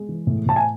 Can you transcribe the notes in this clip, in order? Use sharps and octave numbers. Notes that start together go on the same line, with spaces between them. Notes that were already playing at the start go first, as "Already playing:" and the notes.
Already playing: G#3
E3
A2
A2 A5
G#5